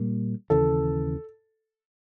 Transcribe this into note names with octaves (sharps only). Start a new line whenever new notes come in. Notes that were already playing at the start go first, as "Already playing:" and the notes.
Already playing: A#2 G3 A#3
D#2 C#3 E3 A4